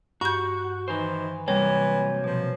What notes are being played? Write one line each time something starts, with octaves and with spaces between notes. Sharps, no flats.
G2 F#4 C#6 G6
D#3 E3 D#4 C5
C3 E3 F#3 G3 A#3 C#5
B2 F3